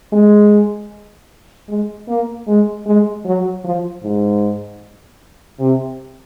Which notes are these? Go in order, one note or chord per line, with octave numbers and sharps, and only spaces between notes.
G#3
G#3
A#3
G#3
G#3
F#3
F3
G#2
C3